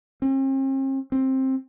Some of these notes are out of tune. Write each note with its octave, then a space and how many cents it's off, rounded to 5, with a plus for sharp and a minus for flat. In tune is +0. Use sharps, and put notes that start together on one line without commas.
C4 +45
C4 +15